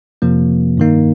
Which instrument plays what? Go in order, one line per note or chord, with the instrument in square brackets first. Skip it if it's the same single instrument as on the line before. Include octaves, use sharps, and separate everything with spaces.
[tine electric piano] F2 C3 F3 A#3
G2 D#3 A#3 D#4